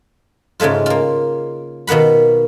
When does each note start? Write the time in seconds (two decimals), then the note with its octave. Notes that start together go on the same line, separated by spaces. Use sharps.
0.60 G#2 C#3 G#3 A3 F4
0.86 A#3 F4
1.87 B2 D#3 A#3 F#5 B5